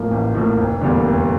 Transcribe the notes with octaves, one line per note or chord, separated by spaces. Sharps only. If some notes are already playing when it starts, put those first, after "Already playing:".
Already playing: A2 F3 A#3
A1
A2 F3 A#3
F1
E2 D3 G3 A#3
F1